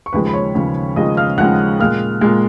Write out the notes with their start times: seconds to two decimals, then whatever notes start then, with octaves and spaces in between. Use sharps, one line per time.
0.06 C#6
0.13 D#2 C#3 F3 G#3 B4 B5
0.27 B5
0.33 C#5 C#6
0.55 D#2 C#3 F3 G#3
0.96 D#2 C#3 F3 G#3 D#5 D#6
1.17 F5 F6
1.38 D#2 C#3 F3 G#3 F#5 F#6
1.79 A#2 G#3 F5 F6
2.21 A#2 G#3